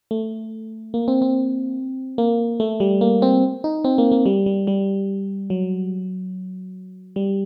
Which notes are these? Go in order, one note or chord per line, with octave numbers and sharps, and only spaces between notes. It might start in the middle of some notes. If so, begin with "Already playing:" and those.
A3
A#3
C4
C4
A#3
A3
G3
A#3
C4
D#4
C4
A#3
A#3
G3
G3
G3
F#3
G3